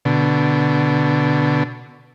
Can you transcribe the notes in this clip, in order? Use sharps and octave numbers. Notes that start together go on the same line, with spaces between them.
B2 D3